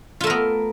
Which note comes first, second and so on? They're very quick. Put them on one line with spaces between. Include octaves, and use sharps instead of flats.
F4 A3 A#4 B3